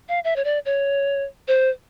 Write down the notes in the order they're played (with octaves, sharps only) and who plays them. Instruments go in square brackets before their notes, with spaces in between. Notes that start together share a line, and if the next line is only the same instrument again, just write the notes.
[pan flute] F5
E5
C#5
D5
C#5
C5